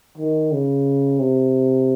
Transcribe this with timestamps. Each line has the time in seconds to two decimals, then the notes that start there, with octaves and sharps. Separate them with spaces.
0.18 D#3
0.52 C#3
1.19 C3